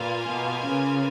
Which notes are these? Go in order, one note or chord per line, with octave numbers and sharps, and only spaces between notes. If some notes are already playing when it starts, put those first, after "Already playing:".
Already playing: A#2 A#3 F4 B4 F5 G#5
B2
C#3